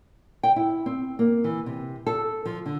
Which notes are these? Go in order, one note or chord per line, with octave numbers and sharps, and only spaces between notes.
G5
E4
C4
A#3
E3
C3
A4
F3
D3